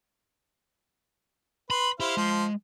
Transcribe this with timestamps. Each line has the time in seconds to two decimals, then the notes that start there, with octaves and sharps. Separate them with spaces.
1.70 B4 B5 C6
2.00 E4 G4 C5 F5
2.17 F3 G#3 C6